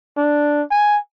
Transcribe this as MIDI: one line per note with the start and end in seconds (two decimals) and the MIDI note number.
0.17 0.63 62
0.71 0.98 80